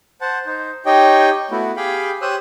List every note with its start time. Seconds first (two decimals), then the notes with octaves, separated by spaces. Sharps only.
0.21 C5 F#5 A5
0.46 D#4 C5
0.86 D#4 G4 C#5 D#5 G5
1.51 A3 B3 E4 F#4
1.77 G4 G#4 F5 G5 B5
2.22 G4 C5 C#5 D#6 E6 F#6